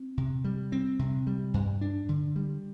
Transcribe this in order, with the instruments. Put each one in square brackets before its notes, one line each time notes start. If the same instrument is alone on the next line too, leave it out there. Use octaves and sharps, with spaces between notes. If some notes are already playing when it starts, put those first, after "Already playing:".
Already playing: [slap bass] C4
C3
G3
C4
C3
G3
G2
D4
D3
G3